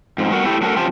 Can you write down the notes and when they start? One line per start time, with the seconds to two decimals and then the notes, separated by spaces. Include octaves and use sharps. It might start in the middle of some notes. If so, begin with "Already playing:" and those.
0.18 F2 G#2
0.31 G3 A3 B3 F#4 A#4 F#5
0.45 A3 E4 G4
0.61 F#2 A3 F#4 A4 A#4
0.76 F#2 C3 F4 G4 C5 A5